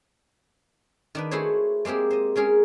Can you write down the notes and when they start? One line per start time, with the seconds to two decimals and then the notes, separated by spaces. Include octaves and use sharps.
1.15 D#3 D4 B4
1.31 A3 E4 F#4 G#4 C5 C#5
1.85 G#3 A#3 C4 G4 G#4
2.10 C5 D#5
2.36 G#3 C#4 G#4 A#4